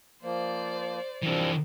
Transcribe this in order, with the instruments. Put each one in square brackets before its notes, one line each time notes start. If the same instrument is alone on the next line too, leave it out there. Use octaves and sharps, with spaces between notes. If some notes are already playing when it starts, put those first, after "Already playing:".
[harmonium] F3 A#3 [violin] C5 D5
[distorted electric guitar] E3 D4 [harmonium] F3 G3 C4